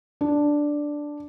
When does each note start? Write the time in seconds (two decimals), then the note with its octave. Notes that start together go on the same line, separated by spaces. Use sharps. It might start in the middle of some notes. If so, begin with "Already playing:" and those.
0.21 D4